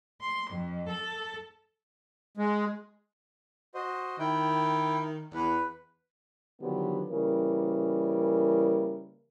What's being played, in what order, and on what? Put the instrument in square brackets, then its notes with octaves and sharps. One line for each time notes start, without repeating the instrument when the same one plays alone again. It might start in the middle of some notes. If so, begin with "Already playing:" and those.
[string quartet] C6
F2
A4
[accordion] G#3
[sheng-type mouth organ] F#4 C5 D#5
[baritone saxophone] D#3 [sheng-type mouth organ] E4 G5
[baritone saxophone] E2 [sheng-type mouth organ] B4
[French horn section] D3 D#3 F3 F#3 B3 G4
C#3 E3 G3 A#3 A#4